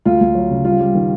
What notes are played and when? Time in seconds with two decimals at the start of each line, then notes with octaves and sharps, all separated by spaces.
0.05 D2 F4
0.21 D2
0.35 F#3
0.50 C#3
0.64 G3 F4
0.80 G3
0.95 D#3